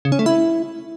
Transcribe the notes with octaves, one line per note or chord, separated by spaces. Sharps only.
C#3
C#4
A3
E4